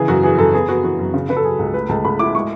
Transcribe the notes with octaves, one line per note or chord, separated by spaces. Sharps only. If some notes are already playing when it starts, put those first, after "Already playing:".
Already playing: C#3 E3 G#4
F#2 F#4
E3 G#4
F#2 A4
B3 G#4
B3 F#4
E3 F#4
F#2
C#3
C#3 B4
A4
F#3 G#4
C#2
A3 B4
C#2 A5
C#2 B5
E4 D6
G#3 C#6